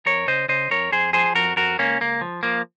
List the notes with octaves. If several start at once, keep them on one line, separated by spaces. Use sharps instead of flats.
F2 A#4 C#5
C#3 C5 D#5
C#3 C5 D#5
F2 A#4 C#5
F2 G#4 C5
F3 G#4 C5
F2 F#4 A#4
F2 F#4 A#4
C#2 A#3 C#4
C#2 A#3
F3
F3 A#3